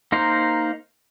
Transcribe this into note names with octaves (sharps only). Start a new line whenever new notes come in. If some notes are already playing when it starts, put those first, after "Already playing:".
A#3 D#4 A#4 C5